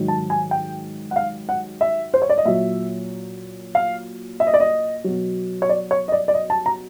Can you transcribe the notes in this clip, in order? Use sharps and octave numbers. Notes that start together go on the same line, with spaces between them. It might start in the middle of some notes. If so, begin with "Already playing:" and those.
Already playing: G#2 D#3 F#3
A5
G#5
G5
F#5
F5
F#5
E5
C5
C#5
D5
D#5
A#2 F#3 E5
F5
E5
D#5
D5
D#5
B2 F#3
C#5
D5
C#5
D#5
D5
D5
D#5
A5
A#5